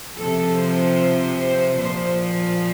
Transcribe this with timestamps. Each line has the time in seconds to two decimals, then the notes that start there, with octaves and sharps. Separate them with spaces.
0.17 C3 F3 A4
0.58 C5
1.37 C5
1.77 A#2 F3 C5